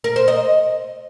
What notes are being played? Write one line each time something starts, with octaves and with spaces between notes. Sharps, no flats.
A#4
C5
D#5